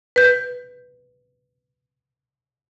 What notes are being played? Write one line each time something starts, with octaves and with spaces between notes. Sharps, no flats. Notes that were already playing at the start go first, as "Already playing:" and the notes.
B4 G6